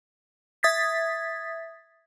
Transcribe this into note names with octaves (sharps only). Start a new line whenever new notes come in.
E5 D#6 G#6 A6 B6